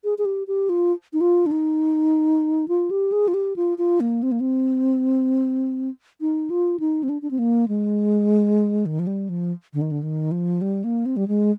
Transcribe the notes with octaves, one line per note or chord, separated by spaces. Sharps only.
G#4
G#4
G4
G4
F4
D#4
F4
D4
D#4
F4
G4
G#4
F4
G4
F4
F4
A#3
C4
A#3
C4
D#4
F4
D#4
C4
D4
D4
C4
A#3
G#3
D#3
F3
G3
F3
D3
D#3
D3
D#3
F3
G3
A#3
C4
G3
G#3